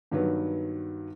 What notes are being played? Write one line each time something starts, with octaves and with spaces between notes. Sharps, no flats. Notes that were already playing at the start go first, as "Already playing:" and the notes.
G2 D#3 F#3 B3